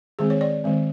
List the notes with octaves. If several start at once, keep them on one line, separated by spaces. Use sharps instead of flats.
D#3 G#3 C4 G#4
C#5
D5
D#3 G#3 C4